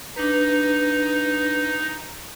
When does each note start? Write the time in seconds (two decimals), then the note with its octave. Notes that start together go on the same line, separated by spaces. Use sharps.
0.16 D4 D#4 B4